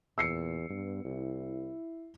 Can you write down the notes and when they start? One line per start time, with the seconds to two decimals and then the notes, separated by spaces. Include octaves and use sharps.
0.18 E2 A#2 E6 C7 C#7
0.69 G2 B3
1.05 C2 E4